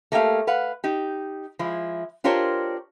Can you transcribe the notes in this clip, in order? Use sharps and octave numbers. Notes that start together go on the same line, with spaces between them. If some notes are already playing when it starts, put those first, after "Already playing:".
A3 A#3 G4 E5 F5
B4 F5 F#5
D#4 G4
F3 G#3 E4
D4 F4 G4 A#4 C5 C#5